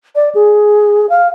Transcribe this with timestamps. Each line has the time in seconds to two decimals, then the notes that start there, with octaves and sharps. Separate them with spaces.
0.15 D5
0.35 G#4
1.10 F5